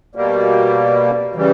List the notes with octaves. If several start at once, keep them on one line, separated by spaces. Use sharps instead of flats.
B2 G3 A#3
C#3 E3 G3